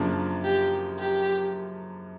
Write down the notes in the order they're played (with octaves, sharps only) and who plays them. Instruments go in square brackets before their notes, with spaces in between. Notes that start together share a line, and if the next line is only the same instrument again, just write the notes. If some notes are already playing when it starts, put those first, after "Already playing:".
Already playing: [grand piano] F#2 C#3 F3 A#3 D4
[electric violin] G4
G4